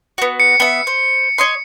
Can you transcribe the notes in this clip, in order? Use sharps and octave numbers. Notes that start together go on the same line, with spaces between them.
B3 F#4
C#7
B3 E5
C5
C#5 D#5 C6